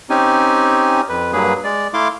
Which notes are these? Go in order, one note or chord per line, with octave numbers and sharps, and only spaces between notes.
C4 C#4 D#4 G4 G#5
F2 B4
G2 F#3 A#3 G#4 B4
G#3 D5
A3 E4 F5 C6 D6